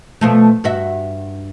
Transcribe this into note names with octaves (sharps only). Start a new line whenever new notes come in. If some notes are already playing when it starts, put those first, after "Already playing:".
B2 F3 A3
G2 F#4 E5